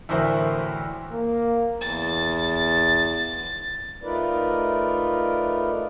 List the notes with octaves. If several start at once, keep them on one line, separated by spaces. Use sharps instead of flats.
D2 A2 E3 A#4 C5 E5
A#3
E2 A6
A3 D#4 F4 A#4 B4 D5